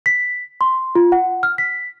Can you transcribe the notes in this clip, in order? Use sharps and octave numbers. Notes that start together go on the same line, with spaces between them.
B6
C6
F4
F#5
F6
B6